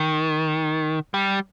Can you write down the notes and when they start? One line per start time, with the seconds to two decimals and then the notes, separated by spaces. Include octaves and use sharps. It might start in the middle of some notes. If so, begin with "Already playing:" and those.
Already playing: D#3
1.14 G3